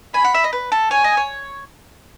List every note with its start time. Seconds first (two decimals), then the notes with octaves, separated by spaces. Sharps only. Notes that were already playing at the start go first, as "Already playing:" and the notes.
0.14 G#5 B5
0.24 F#5
0.34 E5
0.44 D#5
0.53 B4
0.72 A4
0.91 C#5 G#5
1.04 D#5
1.17 C#5